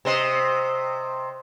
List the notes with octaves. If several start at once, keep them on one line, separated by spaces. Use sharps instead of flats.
C3 C5 D#5